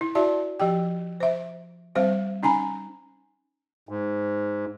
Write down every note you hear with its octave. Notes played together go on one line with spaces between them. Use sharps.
E4
E4 F#4 D5 E5 A5
F3 G4 G5
C5 E5
G3 C4 C5 F5
C#4 D#4 G#5 A#5 B5
G#2